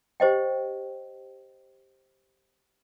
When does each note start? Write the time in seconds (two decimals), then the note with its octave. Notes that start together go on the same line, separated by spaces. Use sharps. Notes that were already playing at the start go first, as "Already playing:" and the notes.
0.20 G4 C5 D#5 G5